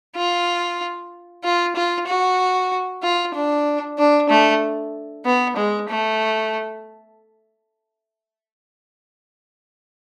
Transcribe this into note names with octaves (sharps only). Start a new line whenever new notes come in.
F4
F4
F4
F#4
F4
D4
D4
A3
B3
G#3
A3